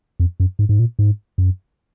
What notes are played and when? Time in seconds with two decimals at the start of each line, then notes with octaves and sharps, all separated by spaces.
0.20 F2
0.40 F#2
0.59 G#2
0.69 G#2
0.79 A#2
0.99 G#2
1.38 F#2